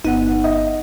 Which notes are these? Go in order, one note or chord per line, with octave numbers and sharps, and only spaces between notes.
G1 B3 D#4 F#5
D#5